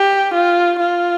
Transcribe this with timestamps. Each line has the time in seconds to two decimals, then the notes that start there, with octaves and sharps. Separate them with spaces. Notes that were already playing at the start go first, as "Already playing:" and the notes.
Already playing: G4
0.34 F4
0.80 F4